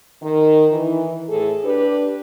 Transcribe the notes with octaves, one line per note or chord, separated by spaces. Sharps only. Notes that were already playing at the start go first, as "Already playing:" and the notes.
D#3
E3
A2 G#4 A4
D4 G4 B4